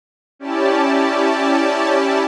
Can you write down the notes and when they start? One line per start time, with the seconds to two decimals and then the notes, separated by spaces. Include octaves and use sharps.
0.39 C#4 E4 G4 D5 A5